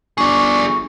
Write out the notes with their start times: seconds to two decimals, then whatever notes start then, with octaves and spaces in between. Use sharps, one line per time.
0.18 G1 G#4 D5 C#6